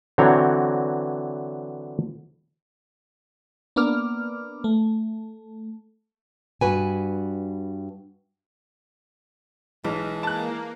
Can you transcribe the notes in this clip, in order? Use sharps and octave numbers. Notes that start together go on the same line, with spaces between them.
D3 E3 F#3 C4 C#5 A#5
A#3 B3 D4 D6 F6
A3
G2 F#4 B4 G#5
B1 E3 G#3
A#3 A5 F#6